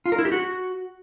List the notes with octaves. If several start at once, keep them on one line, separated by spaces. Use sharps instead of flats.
F4
A#4
E4
G4
F#4